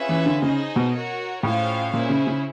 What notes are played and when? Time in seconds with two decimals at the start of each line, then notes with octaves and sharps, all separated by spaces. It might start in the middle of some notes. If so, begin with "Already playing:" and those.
Already playing: C#4 F4 G#4 B4 E5
0.09 E3
0.26 D3
0.42 C#3 D#4 G#4 C5 D#5
0.76 B2
0.93 F#4 A#4 C#5
1.43 A2 C#4 F4 G#4 C5 F5
1.93 A#2 C#4 E4 G#4 C5
2.09 C#3
2.27 C#3